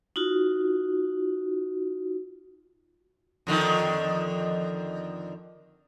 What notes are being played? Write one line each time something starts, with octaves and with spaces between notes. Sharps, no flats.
D#4 F4 F#4
F2 D3 D#3